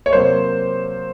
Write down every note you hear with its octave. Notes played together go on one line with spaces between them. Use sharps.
C#5
C3 F#3 A#3 C5